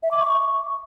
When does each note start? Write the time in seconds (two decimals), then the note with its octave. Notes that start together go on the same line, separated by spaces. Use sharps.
0.03 E5
0.11 D6
0.20 C#6